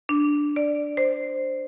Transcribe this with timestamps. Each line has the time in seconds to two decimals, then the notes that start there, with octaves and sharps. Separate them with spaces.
0.09 D4
0.56 D5
0.97 C5